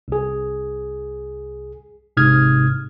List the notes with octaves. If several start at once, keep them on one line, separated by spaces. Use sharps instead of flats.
C2 G#4
A1 G#2 C3 D#6 F6 G#6